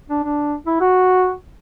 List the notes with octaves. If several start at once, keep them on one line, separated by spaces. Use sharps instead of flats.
D4
D4
E4
F#4